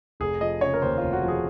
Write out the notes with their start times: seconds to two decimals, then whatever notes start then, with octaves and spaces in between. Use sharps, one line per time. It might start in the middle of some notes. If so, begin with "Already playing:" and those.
0.20 F1 G#4
0.41 F3 D#5
0.61 C#3 C#5
0.74 A#4
0.82 D#2 C5
0.98 F1 F4
1.13 F#4
1.23 F3
1.28 G#4